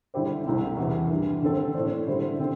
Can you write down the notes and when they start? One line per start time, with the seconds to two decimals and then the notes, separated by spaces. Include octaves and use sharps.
0.14 D3 G3 E4 G4 C5
0.46 C2 C3 A3 C4 E4
0.77 E2 C3 E3
1.10 G2 E3 G3
1.42 D3 C4 A4 C5
1.74 A2 A3 D4 C5
2.07 D3 G3 E4 A4 C5
2.39 D3 C4